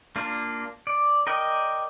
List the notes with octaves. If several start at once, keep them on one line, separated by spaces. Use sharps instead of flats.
A#3 D4 F4
D5
A#4 D5 D#5 G5